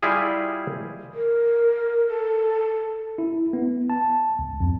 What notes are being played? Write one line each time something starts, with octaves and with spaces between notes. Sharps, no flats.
G3 E4 F4 G#4 D#5
A#4
A4
E4
B3
A5
C#2
F2